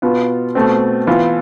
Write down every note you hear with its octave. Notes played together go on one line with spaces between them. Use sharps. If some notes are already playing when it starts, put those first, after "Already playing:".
B2 B3 F4
B2 A3 C4
E3 B3 F4